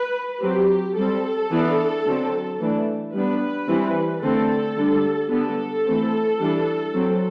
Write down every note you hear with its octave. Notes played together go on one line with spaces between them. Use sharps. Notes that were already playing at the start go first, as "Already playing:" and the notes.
Already playing: B4
F#3 C4 G4
G3 C4 A4
E3 B3 D4
D3 F#3 C4
E3 A3 D4
G3 B3 D4 B4
E3 G3 C4
D3 A3 C4 A4
D3 G3 D4
D3 G3 B3 D4 A4
E3 A3 C4
E3 G3 D4
F#3 C4